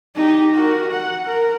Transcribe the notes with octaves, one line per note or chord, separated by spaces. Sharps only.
D#4 G4
F#4 A#4
F#5
A#4